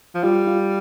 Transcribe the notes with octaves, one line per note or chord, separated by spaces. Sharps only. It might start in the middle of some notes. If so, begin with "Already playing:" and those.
F3
G3 F4
F4